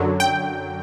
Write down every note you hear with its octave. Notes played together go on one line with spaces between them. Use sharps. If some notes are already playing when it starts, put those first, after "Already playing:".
Already playing: F#2 D3 F#3
G5